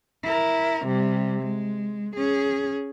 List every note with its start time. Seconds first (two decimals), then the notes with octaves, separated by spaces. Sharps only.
0.24 E4 A#4
0.86 C3 G3
1.42 G#3
2.16 C#4 G#4